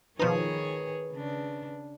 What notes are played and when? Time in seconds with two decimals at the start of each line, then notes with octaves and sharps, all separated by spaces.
0.20 B2 D#3 F3 D#4 G#4 B4 C#5
1.13 C#3 D4